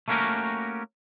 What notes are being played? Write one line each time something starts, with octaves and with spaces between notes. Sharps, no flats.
A3 A#3 C#4 F#4 G4 A#4